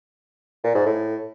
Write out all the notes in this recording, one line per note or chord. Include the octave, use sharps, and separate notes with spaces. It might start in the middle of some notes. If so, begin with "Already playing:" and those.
A#2
G#2
A2